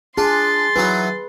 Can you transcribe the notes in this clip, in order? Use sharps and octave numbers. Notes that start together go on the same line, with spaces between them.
D4 F4 G#4 C6 A6
E3 F#3 D#4 B4